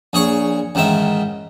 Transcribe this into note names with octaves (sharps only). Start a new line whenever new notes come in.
A#1 G#4 C#5 C#6
A1 G#2 D#3 E5